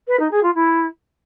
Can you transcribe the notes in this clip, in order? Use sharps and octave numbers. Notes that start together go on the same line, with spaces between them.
B4
D#4
G#4
F4
E4